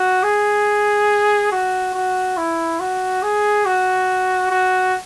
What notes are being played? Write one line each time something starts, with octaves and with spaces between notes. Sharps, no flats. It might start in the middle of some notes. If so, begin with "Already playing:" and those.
Already playing: F#4
G#4
F#4
F#4
E4
F#4
G#4
F#4
F#4